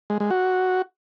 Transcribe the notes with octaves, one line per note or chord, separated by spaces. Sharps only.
G#3
G#3
F#4